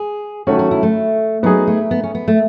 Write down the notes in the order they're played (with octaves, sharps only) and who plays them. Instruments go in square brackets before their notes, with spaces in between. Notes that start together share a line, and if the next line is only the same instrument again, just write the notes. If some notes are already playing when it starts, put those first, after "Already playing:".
Already playing: [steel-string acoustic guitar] G#4
[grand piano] D#3 F#3 A3 C#4 [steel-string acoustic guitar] F#4
[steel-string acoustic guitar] F#4
E4
A3
[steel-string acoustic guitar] F#3 [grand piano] B3 D#4 G#4
[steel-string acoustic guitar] A3
B3
C#4
B3
A3